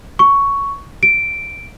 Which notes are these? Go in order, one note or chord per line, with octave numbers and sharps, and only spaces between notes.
C#6
D7